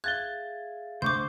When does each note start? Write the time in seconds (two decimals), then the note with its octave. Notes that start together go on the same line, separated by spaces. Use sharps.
0.04 G#4 E5 F5 F#6 G#6 A6 G7
1.02 D2 C5 C#6 D6 G6